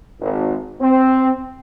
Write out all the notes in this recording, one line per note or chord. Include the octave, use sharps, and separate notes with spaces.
G#1
C4